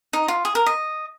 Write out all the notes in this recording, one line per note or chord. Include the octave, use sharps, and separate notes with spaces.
D#4
F4
G#4
A#4
D#5